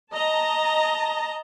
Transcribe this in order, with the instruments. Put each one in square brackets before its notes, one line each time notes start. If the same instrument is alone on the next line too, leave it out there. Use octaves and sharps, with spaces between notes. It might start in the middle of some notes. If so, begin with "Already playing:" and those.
[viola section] D#5 A5 A#5